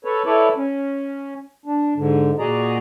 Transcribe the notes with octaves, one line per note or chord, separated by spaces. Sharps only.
A4 B4 C#5
E4 A4 B4 C#5 D5
C#4
D4
G#2 D3
A#2 F#4 G#4 D5 D#5 A#5